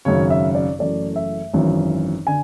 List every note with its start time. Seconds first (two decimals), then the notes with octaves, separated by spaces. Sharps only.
0.05 G#1 F#2 C#3 C#5
0.30 E5
0.55 D5
0.79 F#1 F#2 E3 A3 D5
1.16 E5
1.53 G#1 F#2 E3
2.27 D3 G#5